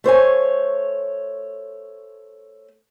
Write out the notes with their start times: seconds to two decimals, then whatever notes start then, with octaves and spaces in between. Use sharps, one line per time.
0.04 A3 C5 C#5 G#5